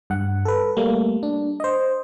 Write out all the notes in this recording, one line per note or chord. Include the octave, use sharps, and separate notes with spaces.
G2 F#5
A4 B4
G3 A3 A#3
D4
C5 D#5